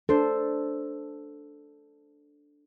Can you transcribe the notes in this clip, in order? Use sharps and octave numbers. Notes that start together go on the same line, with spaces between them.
D4 A4 C5